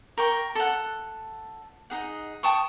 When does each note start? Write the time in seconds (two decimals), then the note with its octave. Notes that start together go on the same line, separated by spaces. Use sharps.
0.18 A#4 G5 C#6
0.55 A4 F#5
1.90 D#4 G#4 F#5
2.43 G5 A5 C#6 D#6